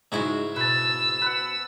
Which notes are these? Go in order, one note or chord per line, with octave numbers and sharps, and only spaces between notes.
G#2 C#3 F#3 G#3 D#4 E4 G#5
B2 B4 A5 E6
B4 F#5